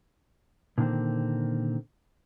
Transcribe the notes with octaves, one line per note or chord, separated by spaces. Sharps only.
A#2 D3 D#3 A#3 C4